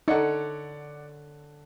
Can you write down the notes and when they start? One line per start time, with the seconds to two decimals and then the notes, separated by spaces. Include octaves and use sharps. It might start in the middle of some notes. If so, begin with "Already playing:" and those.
0.08 D3 D#4 C#5 D5 F#5